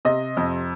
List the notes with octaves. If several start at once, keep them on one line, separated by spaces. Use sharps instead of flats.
C3 D#5
F2